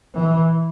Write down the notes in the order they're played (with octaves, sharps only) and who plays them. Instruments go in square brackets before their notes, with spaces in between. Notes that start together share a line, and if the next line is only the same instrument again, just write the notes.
[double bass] E3